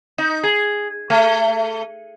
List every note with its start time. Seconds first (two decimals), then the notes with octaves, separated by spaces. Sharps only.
0.18 D#4
0.43 G#4
1.10 A3